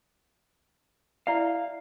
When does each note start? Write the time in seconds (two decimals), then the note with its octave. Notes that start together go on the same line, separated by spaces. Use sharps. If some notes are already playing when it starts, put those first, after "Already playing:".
1.27 E4 D5 E5 F5